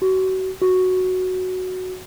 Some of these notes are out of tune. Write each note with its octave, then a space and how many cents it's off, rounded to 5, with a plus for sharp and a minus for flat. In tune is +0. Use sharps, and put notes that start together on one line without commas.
F#4 +30
F#4 +0